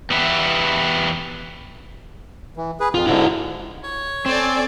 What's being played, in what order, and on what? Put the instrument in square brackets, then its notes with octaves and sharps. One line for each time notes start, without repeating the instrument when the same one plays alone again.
[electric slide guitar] E2 B3 G4 B4 E5
[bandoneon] E3
G#4 B4
[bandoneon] F2 [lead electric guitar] F4
[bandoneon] G#2 D3 [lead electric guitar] E4 F#4
[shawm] C#5
[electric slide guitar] C4 [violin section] A4 D5 G#5